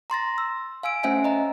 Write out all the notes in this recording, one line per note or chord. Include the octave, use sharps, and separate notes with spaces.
A#5 C6 A6 A#6
E6
F5 G#5 E6 D7
A3 C#4 C5 E5 F#5 G#5
D#5 A#5